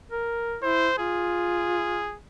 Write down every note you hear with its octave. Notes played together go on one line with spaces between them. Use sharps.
A#4
E4 C5
F4 G#4